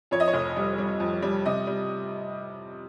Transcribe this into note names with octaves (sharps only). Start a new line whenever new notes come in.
F2 C#5
D#5
C#5
F1
G3
G3
F2
G3
C3 D#5
G3